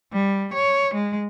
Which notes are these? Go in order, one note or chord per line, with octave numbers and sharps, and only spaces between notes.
G3
C#5
G#3